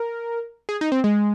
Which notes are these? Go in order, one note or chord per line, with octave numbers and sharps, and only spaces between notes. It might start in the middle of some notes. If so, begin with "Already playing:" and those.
Already playing: A#4
G#4
D#4
C4
G#3